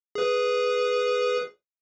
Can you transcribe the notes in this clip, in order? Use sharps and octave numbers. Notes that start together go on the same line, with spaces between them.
G#4 B4